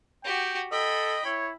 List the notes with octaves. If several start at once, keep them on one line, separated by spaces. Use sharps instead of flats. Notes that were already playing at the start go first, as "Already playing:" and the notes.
F#4 G4 G5
A4 D#5 G5 B5
E4 C#5